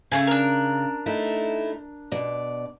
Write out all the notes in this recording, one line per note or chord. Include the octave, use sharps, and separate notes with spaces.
C#3 A3 C4 G#4
D4 A#4
A3 D#4 E4
B2 D5